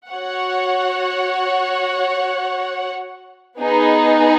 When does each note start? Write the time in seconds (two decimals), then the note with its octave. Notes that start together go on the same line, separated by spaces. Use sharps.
0.10 F#4 C#5 F#5
3.59 B3 D#4 G#4